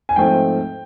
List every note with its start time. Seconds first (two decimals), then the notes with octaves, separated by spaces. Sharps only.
0.09 G#5
0.16 G#2 F3 A3 C4 G5